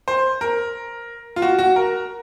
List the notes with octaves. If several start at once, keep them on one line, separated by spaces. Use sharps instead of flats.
C5
A#4
F4
F#4
F#4
A#4